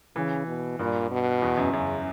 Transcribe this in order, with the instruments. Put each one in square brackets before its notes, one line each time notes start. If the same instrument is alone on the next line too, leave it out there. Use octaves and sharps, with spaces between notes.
[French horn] C#3 [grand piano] E3
[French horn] B2
[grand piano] G2 [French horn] A#2
[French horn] B2
[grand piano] E2
F#2
[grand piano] F#2 [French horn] C#3